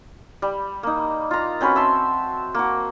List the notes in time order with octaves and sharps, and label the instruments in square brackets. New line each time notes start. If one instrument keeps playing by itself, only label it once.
[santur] G3
A#3 D#4
F4 A#5
C4 C#4 F#4 B4
E5 A5 C6
A#3 F#4